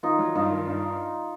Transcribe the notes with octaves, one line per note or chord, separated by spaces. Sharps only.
D#3 D#4 F4
F#3
G2 D#4 F4
D#3
G2